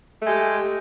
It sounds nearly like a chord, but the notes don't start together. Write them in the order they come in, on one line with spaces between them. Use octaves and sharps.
A3 G#3 G4